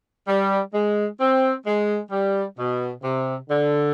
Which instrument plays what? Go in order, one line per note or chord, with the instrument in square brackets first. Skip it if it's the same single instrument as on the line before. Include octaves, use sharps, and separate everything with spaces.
[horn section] G3
G#3
C4
G#3
G3
B2
C3
D3